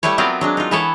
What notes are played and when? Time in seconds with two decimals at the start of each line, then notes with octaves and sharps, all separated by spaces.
0.03 G3 A3 E4 B4 C#5
0.18 F#3 B3 C4 F4 A#4 D5
0.41 F#3 G#3 D4
0.57 D#4 F4
0.71 E3 B3 E4 A4 C#5